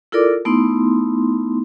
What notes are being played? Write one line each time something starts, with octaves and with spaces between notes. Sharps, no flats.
E4 F4 A4 A#4 D5 D6
A3 B3 D#4 E4 C6